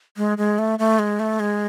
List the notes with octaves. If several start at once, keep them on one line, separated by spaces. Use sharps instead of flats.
G#3
G#3
A3
A3
G#3
A3
G#3